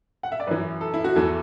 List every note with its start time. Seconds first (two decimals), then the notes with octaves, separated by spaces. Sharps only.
0.23 F#5
0.32 E5
0.40 D5
0.47 F#2 E3 B4
0.81 A4
0.94 E4
1.04 F#4
1.16 E2 E3 A4